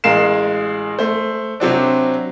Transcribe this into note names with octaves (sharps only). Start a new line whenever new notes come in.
A1 G#3 A#4 F5 C7 E7
A3 C5
C3 F#3 C4 D4